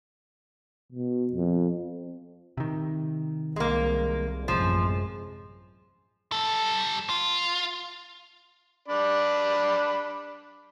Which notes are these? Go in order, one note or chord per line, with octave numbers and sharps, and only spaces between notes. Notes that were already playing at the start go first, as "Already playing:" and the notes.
B2
F2
C3 D#3
C2 G#3 A#3
A1 F#2 C3 F3 G#3
G3 A4
F4
D4 D5 B5